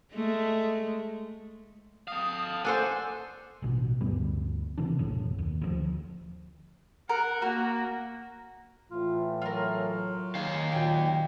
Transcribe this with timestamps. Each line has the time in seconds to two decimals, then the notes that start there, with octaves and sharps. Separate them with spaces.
0.14 G#3 A3
2.08 A4 F5 D#6
2.65 D4 A4 C5 F#5 G#5
3.62 A1 B2
4.01 D2 G2 G3 B3
4.78 C3 E3 D4
4.99 F1 B1 F#2 A2
5.38 D#2
5.61 D2 C3 F3
7.09 A#4 F#5
7.42 A#3 F#4
8.91 A2 E3 F4
9.42 F#3 F4 A#4
10.35 D#3 G#4 F5
10.72 A#2 F#3 G5 G#5